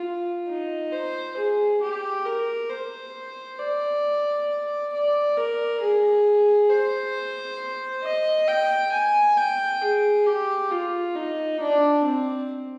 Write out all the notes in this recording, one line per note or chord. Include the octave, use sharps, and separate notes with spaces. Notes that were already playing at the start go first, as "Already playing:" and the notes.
Already playing: F4
D#4
C5
G#4
G4
A#4
C5
D5
D5
A#4
G#4
C5
D#5
G5
G#5
G5
G#4
G4
F4
D#4
D4
C4